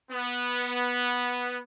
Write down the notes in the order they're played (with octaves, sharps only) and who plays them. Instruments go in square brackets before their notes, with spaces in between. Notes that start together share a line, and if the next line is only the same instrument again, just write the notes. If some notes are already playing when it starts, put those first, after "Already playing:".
[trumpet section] B3